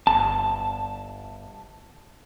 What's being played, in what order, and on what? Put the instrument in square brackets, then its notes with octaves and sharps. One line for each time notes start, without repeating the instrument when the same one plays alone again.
[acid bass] G1 [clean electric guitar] A5